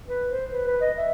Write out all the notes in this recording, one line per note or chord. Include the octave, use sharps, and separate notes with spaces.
B4
C5
B4
B4
D#5
E5